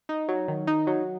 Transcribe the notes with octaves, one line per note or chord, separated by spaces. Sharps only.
D#4
F#3
D#3
D#4
F#3